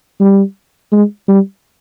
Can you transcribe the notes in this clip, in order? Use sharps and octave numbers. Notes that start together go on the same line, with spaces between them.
G3
G#3
G3